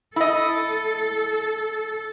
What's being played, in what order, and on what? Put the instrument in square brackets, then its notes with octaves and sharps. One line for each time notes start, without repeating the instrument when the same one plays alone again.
[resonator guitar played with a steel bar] E4 D#5 [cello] A4